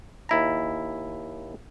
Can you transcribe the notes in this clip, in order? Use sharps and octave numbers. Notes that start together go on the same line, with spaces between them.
D#2 E4 A#5